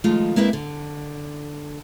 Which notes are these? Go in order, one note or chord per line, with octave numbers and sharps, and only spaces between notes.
D#3 F3 G#3 A3 F4
G#3 A#3 C4 E4 B4 E5
D3